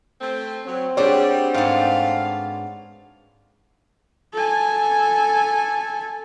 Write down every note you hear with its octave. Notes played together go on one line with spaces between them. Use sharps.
A3 C4
F#3 C4
G3 D4 F#4 G#4 C#5
G#2 A3 B3 D5 F5
A4 G#5